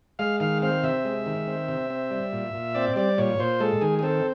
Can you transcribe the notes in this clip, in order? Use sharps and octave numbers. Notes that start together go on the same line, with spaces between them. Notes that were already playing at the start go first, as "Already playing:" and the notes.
G#3 F5
D#3 F5
C4 F5
C3 E5
G#3
D#3
C4
C3
C4
G3
A#2
A#2
C4 D5
G3 D5
A#2 C#5
A#2 C5
G#3 A4
D#3 G#4
G#4
C4 A4